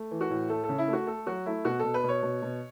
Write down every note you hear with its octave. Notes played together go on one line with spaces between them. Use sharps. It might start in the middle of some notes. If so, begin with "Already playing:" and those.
Already playing: A3
E3
F#4
A2
A3 A4
A4
C#3
E4
A3
F#4
A3 A4
F#3 F#4
A3 E4
B2 F#4
B2 A4
B4
B2 C#5
B2
B2